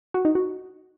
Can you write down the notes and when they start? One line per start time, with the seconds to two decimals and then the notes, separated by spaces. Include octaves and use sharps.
0.14 F#4
0.25 D#4
0.35 F#4